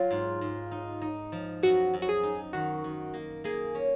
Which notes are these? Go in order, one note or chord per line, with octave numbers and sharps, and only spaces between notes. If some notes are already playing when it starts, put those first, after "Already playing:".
Already playing: F#3 F4
G#2
G#2
D#4
D#4
F3
F#2 F#4
F#2
F#4
G#4
D#4
D#3 F#4
D#3
A#3
A#3 G#4
C#4